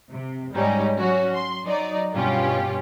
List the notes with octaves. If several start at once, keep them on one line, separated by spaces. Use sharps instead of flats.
C3
G#2 G3 C#4 D#4
F#3 C#4 F#4 C#5
C6
F#3 D#4 D5
G2 B2 C#4 F4 G4